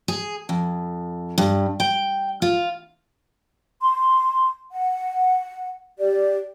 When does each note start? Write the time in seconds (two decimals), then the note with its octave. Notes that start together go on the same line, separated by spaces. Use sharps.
0.08 G#4
0.49 F2
1.38 G2
1.80 G5
2.42 F4
3.82 C6
4.72 F#5
5.99 G4 D5